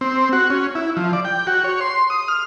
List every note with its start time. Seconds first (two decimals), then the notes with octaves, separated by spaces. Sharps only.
0.01 C4
0.33 F#4
0.50 C#4
0.75 E4
0.97 F3
1.13 D5
1.25 G5
1.47 F#4
1.64 C#5
1.81 C6
2.10 D#6
2.28 F6